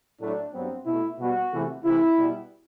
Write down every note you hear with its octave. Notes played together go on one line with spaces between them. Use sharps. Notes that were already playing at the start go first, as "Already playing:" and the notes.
A2 F#3 A3 D4
G2 F#3 B3 C4
B2 A3 E4
B2 G3 B3 F#4
E2 C3 E3 A3
C3 E3 A3 E4
B2 G3 B3